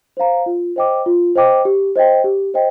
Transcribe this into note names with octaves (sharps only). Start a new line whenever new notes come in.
C5 F5 A#5
F4
C5 D#5 G5 D6
F4
C5 D#5 G5 D6
G4
C5 D#5 G5
G4
C5 D#5 G5